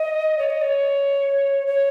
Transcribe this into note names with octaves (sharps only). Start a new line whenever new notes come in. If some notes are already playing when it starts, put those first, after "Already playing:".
Already playing: D#5
C#5
D#5
C#5
C#5